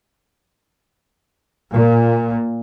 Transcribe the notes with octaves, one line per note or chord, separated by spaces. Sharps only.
A#2